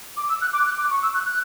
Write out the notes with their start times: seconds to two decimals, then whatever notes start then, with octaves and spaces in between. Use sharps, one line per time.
0.17 D6
0.29 E6
0.41 F#6
0.53 D6
0.65 F#6
0.78 D6
0.90 C#6
1.03 E6
1.14 F#6
1.26 F#6